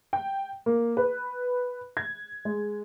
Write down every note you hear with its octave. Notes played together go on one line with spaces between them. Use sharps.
G5
A#3
B4
G#6
G#3